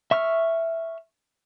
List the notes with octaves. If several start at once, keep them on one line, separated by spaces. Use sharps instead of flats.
E5 C#6 E6 F6